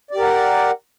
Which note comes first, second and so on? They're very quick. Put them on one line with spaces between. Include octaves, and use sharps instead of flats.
D5 G4 A#4 F#5